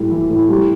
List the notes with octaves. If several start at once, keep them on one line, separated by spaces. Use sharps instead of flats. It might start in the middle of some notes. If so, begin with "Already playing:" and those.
Already playing: A2 G3
E3
A2
G3